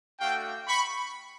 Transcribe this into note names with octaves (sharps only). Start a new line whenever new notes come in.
A3 D4 F#4 F5 G5
B5 C#6